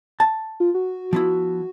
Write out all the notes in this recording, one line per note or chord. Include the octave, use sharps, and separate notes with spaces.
A5
F4
F#4
F3 B3 E4